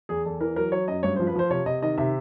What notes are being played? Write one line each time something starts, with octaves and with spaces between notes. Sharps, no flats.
E2 G#4
E2 A4
E3 A#4
F#3 A#4
F#3 C#5
F#2 D#5
G2 C#5
C5
F3
B4
F3 C5
C3 C#5
C3 D#5
D#3 D#5
C3 E5